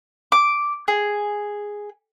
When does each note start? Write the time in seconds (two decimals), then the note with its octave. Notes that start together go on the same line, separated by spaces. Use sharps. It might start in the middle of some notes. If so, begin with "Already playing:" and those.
0.32 D6
0.88 G#4